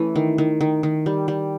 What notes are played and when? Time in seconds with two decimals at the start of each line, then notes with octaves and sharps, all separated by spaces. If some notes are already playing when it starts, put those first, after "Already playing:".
Already playing: E3 A3 C#4
0.16 D#3
0.38 D#3
0.61 D#3
0.83 D#3
1.06 G3
1.28 G3